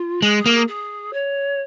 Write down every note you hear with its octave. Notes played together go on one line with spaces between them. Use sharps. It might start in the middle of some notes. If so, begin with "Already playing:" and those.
Already playing: F4
G#3 G#4
G#4
A#3
G#4
G#4
C#5